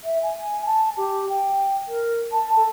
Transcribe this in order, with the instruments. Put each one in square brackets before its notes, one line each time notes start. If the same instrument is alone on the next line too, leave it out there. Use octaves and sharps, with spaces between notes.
[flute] E5
G#5
A5
G4
G5
A#4
A5
A4